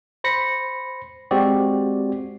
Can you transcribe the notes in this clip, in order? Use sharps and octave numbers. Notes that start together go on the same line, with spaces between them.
C5 B5 A#6 C#7
G#3 C4 F#4 G4 D5